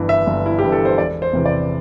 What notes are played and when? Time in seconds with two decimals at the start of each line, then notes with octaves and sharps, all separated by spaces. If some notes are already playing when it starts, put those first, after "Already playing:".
Already playing: G1 G2 E3
0.09 E5
0.27 G1
0.46 E4
0.59 G2 E3 G4
0.72 A4
0.85 C5
0.98 E1 D5
1.22 C5
1.33 E2 C3 E3
1.46 D5